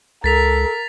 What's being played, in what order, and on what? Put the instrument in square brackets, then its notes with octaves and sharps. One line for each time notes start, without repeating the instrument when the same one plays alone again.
[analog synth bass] C#2 [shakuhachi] A4 [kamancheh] A#4 [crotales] A6 B6 F7